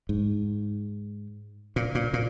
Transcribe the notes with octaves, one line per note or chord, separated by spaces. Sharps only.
G#2
A#2
A#2
A#2